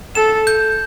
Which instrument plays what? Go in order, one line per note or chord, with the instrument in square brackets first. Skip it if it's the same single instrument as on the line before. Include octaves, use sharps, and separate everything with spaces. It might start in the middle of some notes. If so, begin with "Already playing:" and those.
[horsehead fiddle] A4 [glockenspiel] E7
[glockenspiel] G6